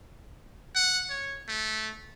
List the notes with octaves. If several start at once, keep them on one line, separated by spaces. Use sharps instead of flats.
F#5
C#5
A3